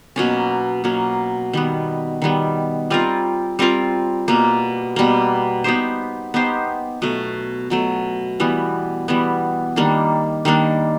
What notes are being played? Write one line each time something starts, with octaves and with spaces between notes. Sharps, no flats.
B2 F#3 A#3 C#4
B2 F#3 A#3 C#4
D#3 G3 B3
D#3 G3 B3
G3 C4 F4 A#4
G3 C4 F4 A#4
B2 G3 A#3
B2 G3 A#3
B3 D#4 G4 C5
B3 D#4 G4 C5
B2 F#3 A3
B2 F#3 A3
E3 G3 B3
E3 G3 B3
D#3 G3 A#3 D4
D#3 G3 A#3 D4